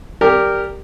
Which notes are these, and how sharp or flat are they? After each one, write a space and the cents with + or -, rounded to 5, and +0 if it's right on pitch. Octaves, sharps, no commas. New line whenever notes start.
G4 +0 A#4 -10 D5 +5